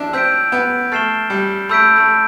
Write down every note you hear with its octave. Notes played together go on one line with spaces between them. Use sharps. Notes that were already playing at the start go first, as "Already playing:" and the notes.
Already playing: F3 D4 E4
C4 E6 G6 B6 D7
B3
A3 F6 A6 C7 E7 G7
G3
A3 B5 E6 G6 B6 D7
A3